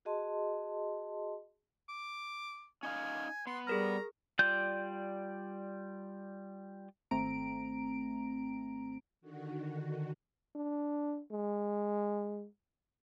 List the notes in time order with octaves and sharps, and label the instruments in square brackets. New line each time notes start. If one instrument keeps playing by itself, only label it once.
[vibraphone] F#4 G#4 D#5 A5 C6
[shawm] D6
[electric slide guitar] C#4 D#4 F5 [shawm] G#5
[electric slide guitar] B3 [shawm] C6
[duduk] G3 [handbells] G#4 A#4 F6 [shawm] A#5
[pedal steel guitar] G3 F4 D5 G6
[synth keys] G#1 A3 C4 A#5 D7
[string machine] D3 D#3 F#4
[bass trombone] D4
G#3